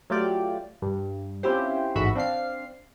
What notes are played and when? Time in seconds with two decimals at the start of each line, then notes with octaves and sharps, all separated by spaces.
0.10 F#3 A3 F4 G4 D5
0.82 G2
1.43 C4 C#4 E4 F4 G4 C5
1.95 A1 G#2 F#4 E5 B5
2.15 C4 D4 F5 C7